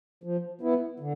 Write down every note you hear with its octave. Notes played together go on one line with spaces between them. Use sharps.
F3
B3 E4
D3